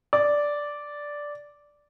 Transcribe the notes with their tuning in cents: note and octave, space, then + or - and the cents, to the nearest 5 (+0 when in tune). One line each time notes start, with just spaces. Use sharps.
D5 -5